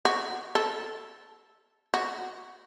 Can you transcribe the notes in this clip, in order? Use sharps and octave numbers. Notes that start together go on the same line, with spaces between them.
F#4
A4
F#4